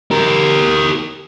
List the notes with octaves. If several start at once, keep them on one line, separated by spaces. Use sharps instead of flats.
G4 A#4